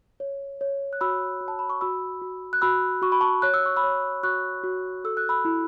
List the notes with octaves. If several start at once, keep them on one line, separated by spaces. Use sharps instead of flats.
C#5
C#5
F#6
F#4 B5 E6
F#4
A5
B5
C#6
F#4 B5 E6
F#4
F#6
F#4 B5 E6
F#4 C#6
B5
A5 C#6
C#5 F#6
E6
C#6
B5 E6
C#5
F#4 C#6 F#6
F#4
A4 E6
F#6
B5 E6
E4